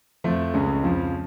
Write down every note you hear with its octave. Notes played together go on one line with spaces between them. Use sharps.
F2 F3 A3
C#2 C#3 G#3 C#4
F2 C#3 F3